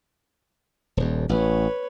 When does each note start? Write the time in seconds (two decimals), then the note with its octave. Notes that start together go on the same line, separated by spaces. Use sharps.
0.97 D#1 D#2
1.29 A1 B4 C#5